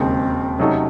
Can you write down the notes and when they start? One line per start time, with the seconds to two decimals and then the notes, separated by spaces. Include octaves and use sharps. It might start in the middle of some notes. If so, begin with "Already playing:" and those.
Already playing: E1 D#2 C#3 G#3 C4
0.59 C3 F#3 A3 C#4 D#4 A4